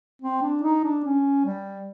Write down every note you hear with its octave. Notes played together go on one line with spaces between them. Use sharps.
C4
D4
D#4
D4
C#4
G3